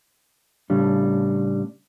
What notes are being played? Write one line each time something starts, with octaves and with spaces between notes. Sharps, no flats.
A2 C#3 G3 D4